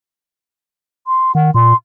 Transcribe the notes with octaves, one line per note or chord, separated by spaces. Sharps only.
C6
D#3 F#5
A#2 C6